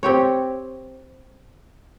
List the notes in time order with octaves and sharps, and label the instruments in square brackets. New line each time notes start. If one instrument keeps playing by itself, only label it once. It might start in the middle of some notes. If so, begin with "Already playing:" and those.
[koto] C4 G4 C#5